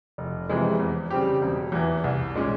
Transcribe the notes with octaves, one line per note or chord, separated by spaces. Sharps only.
F1
F2 C3 E3 G#3
E2
C#3 G3 C4 G4
E1
E2 E3
C2
A#2 G#3 C#4